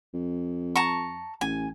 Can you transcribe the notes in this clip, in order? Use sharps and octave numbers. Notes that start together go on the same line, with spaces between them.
F2
A5 A#5 C#6
A1 G#5